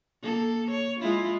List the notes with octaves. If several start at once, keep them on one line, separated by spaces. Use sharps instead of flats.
A#3 A4
C#5
G#3 E4 F4